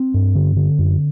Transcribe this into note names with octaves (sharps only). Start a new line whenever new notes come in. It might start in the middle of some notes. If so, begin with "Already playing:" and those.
Already playing: C4
G2
D3
D3
F#2